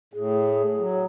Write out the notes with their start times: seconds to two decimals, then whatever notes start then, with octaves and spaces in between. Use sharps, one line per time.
0.13 A2 G#4
0.77 F#3